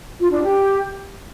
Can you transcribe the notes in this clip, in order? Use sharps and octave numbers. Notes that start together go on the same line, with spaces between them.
F4
D4
G4